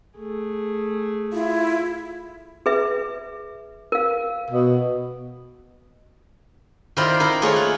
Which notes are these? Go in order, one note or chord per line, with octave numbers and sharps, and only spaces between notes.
A3 G#4
E4 F4
G#4 B4 E5
A#4 F5
B2
D#3 E4 F4 A#4 C5 D5
D#4 E4 A#4
A3 A#3 F4 G#4 A4 C#5
F#5